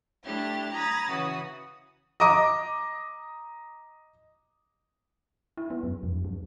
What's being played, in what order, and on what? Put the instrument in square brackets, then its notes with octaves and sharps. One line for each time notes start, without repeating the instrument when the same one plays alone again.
[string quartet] A3 D4 E4 G4 A6
A#5 B5 D#6 G#6 A6
C#3 E3 F#4 D#6
[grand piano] D#5 A#5 D6 D#6
[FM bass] E4
B3
F#2
F2
F#2